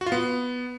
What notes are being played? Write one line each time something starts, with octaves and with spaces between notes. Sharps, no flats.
F#4
F4
B3